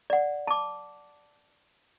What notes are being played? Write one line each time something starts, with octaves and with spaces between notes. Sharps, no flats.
D5 F#5
A5 D6